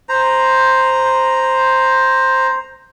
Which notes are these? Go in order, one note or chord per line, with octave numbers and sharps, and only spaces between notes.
C5 A#5